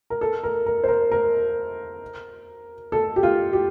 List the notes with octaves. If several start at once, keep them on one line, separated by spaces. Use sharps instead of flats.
A#4
A4
A#4
A#4
C5
A#4
A#4
A4
G4
F4
G4